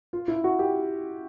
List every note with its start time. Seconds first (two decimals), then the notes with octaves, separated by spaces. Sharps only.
0.13 F4
0.28 E4
0.44 F#4
0.59 G4